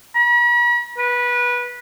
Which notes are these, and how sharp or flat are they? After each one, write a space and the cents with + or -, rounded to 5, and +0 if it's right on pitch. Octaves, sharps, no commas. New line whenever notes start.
B5 -45
B4 -20